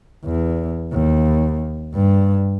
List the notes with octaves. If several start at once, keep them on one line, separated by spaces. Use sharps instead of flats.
E2
D#2
G2